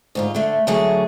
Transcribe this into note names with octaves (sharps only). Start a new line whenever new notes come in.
D2 G#2 F4
D3 A3
D3 F#3 A3 G#4